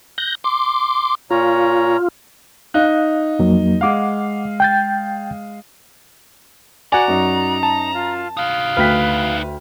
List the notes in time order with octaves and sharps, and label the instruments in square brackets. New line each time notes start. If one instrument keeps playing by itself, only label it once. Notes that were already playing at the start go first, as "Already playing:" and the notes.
[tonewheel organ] F#6 G6 A#6
C6 D6
[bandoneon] A#2 C#5 A#5 [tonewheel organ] F4
[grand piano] D#4 [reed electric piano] F5 F#6
[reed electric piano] F2 F#3 A#3
[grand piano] G#3 F5 [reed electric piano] F#5 D6
[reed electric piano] G5 G6 A6
[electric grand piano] F#4 D5 [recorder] F#5 [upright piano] G#5 [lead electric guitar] A#5
[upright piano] F#2 [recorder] D#4
[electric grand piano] A5
[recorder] F4
[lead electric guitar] D#4 F#4 [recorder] F5
[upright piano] D2 G5 B6 [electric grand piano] B4 F6